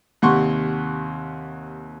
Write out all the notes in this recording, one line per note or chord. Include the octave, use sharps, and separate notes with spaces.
D#2 C3 F#5 C6 C#6